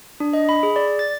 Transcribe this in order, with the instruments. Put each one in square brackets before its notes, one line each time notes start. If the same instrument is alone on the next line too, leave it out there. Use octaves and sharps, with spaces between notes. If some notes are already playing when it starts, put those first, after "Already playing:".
[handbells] D4
D#5
B5
G#4
D5
A6